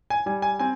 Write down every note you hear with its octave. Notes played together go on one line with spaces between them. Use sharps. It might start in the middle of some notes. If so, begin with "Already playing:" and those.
G#5
G3 G#5
G#5
C4 G#5